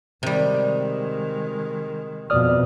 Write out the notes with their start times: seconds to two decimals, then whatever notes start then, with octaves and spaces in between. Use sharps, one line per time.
0.23 C3 D#3 G3 G#3
2.30 F2 B2 D5 D#6 F6